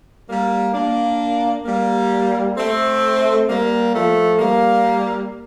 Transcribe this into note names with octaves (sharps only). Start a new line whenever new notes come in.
G3 A#3
A#3 D4
G3 A#3
A3 C4
G3 A#3
F3 A3
G3 A#3